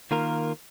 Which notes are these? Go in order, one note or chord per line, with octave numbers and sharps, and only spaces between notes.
D#3 A#3 F4 A#4